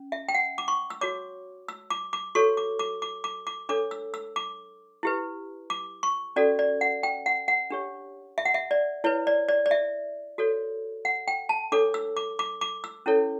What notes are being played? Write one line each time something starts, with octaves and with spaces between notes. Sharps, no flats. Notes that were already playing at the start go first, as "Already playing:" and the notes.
Already playing: C#4
E5
G5
F#5
D6
C#6
E6
F#4 C#5 D6
E6
D6
D6
F#4 A4 C#5 C#6
D6
D6
D6
D6
D6
D4 A4 C#5 D6
E6
E6
D6
E4 G4 B4
D6
C#6
C#4 F#4 A4 D5
D5
F#5
G5
F#5
F#5
D4 G4 C#5
E5
F#5
E5
D5
E4 B4 C#5
D5
D5
D5
E5
F#4 A4 C#5
F#5
G5
A5
D4 A4 C#5 D6
E6
D6
D6
D6
E6
C#4 E4 A4 C#5